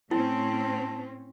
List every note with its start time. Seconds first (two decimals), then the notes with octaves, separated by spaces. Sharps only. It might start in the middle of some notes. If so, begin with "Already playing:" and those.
0.11 A2 C4 C#4 E4 A5